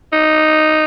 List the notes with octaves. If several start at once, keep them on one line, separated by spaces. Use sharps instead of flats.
D#4